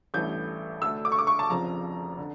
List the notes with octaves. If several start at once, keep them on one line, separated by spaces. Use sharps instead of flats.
A1 G2 E3 A3 G6
D2 D3 A3 E6
D6
C#6
D6
C#6
A5
F1 F2 C#3 F3 A#5
D3